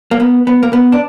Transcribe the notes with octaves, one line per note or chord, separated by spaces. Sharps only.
A#3
B3
B3
A#3
B3
D4